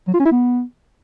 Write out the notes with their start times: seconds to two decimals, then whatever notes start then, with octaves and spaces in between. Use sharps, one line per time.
0.08 F#3
0.14 F4
0.20 C#4
0.26 E4
0.32 B3